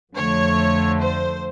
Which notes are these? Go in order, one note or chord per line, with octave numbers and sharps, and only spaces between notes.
F2 D3 F3 A3 C#5
C5